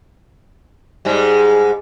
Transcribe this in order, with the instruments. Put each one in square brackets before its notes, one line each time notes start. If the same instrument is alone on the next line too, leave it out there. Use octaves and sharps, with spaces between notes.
[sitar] G#2 G3 G#3